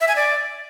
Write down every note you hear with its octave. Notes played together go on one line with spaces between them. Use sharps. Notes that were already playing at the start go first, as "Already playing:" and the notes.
E5
G#5
D5